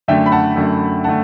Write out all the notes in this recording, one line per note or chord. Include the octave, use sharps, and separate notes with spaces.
F#2 D3 A3 E5 G5
B5
F#5 A5
F#2 D3 A3
D3 A3 F#5 A5